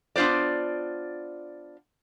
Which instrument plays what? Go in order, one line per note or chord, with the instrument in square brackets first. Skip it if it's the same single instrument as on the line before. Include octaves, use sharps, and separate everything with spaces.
[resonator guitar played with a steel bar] B3 D4 F4 C5 D5